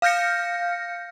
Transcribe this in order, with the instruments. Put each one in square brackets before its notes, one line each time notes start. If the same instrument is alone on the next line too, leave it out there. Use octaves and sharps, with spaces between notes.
[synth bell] F5 F6 G6 A#6 C#7